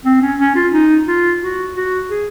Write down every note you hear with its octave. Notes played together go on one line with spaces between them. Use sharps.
C4
C#4
C#4
F4
D#4
F4
F#4
F#4
G#4